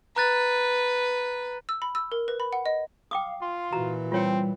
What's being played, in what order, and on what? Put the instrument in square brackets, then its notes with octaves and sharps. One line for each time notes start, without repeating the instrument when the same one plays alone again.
[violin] B4 [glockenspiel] A#5 F#6 A6
[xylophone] E6
B5
E6
A#4
B4
B5
F#5
D#5
[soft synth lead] F5 [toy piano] G5 D6 D#6
[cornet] F4 [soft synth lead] C6
[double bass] A#2 E3 [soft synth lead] F#4 [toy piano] A#5
[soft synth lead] G3 [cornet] C4 [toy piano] F4 C#5 G5